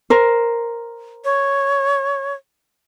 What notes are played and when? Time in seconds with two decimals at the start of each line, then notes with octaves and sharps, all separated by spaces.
0.10 A#4 C5
1.25 C#5